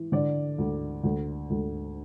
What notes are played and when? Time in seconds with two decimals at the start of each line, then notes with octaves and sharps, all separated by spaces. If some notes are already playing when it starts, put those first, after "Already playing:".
Already playing: E3
0.12 D3 D5
0.58 D2
1.04 D2
1.50 D2